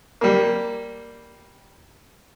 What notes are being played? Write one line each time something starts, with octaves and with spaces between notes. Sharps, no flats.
G3 A#3